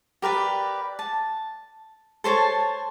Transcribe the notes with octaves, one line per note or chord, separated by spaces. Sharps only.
G4 A#4 B4 D5
A5
A4 C5 C#5 A5